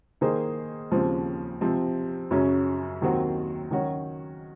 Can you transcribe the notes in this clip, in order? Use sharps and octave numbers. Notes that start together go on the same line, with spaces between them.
D#3 A#3 D#4 G#4 C5
D#2 C#3 F3 C4
C3 F3 C4
F#2 C#3 F#3 C#4
D#2 D#3 F#3 C4 F#4
D#3 F#3 C#4 F#4 C#5